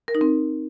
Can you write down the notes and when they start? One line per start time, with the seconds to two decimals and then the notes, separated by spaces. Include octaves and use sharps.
0.08 A#4
0.15 D#4
0.21 C4